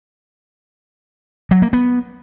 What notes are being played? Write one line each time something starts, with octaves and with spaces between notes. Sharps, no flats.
F#3
A#3
B3